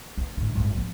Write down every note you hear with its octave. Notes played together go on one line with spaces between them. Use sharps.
B3
G#2 D3
G#1 G2
F3 C4